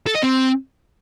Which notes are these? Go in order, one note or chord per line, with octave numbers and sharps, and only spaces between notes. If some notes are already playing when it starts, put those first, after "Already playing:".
A4
D#5
C4